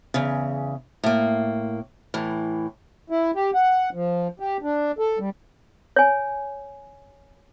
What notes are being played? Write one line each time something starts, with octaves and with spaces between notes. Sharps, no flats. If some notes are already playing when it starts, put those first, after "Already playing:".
E2 C#3
A2 A#3
A2 E3
E4
G4
F#5
F3
G4
D4
A4
G3
C#5 G#5